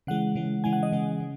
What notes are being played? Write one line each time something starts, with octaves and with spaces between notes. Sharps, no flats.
C#3 E3 G#3 F#5
C#3 E3 G#3
C#3 E3 G#3 G#5
F#5
D#5
C#3 E3 G#3
C#3